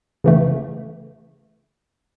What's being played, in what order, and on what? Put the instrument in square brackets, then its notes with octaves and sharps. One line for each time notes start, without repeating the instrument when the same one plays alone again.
[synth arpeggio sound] C#3 E3 A3